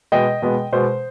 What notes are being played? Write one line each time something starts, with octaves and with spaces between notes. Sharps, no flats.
B2 G#3 B3 D#5 G5
B2 G#3 B3
B2 G#3 B3 C5